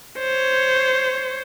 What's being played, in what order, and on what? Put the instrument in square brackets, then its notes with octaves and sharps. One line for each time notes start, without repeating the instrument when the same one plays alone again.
[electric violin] C5 C#5